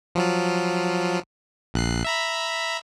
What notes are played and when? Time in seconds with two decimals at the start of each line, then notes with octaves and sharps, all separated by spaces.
0.15 F3 F#3 F4
1.74 A#1 F#6 C7
2.04 E5 A#5 B5